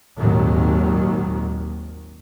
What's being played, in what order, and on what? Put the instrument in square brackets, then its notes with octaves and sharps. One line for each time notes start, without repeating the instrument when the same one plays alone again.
[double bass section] G#1 D#2 A#2 D#3 F#3